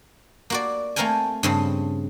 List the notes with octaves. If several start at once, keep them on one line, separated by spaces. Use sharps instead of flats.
A#3 F#4 D5
A3 A#3 C4 A#4 G5 G#5
G2 C#3 C4